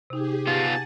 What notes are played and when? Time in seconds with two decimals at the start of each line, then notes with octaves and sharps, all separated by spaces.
0.10 C3 D#4 G4 G#4
0.47 B3 F4 F#5 G#5 A5